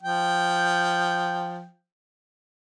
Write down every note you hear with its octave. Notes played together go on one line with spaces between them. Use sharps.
F3 G5